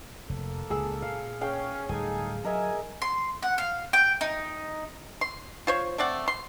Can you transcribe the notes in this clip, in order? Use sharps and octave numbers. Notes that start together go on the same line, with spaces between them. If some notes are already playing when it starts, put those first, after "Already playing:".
F1 A#3 A4
C#2 A#2 G#4 E6
A#2 F5
C#4 G#4 F5 G5
D1 G3 D#4 G#4 A4 G#5
F#3 A#4 D#5 E5 G#5
C6
F#5
F5
G5
D#4
C6
F4 C5 C#5
A3 C4 D5 F#5
C6